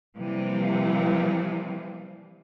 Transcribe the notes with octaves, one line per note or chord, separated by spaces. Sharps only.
C3 E3 F3 G3 A#3